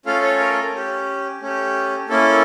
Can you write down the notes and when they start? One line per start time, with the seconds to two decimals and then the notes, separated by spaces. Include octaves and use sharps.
0.06 A3 C#4 F4 A4 F5
0.23 C#5
0.40 A#4
0.73 C#4 G4
1.41 A3 C#4 G4
2.09 A#3 C#4 E4 A4